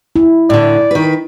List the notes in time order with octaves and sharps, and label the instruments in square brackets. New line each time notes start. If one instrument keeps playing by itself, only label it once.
[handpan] E4
[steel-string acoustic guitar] A2 D3 [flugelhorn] D5
[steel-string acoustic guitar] D#3 B4